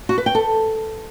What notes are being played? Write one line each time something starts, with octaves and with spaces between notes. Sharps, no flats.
F#4
B4
G5
A4